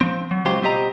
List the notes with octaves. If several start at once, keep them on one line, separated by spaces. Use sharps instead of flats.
F3 C4
F#3
C#2 F#3 F4 G4 C5 C6
B2 G3 C4 G4 D#5 A#5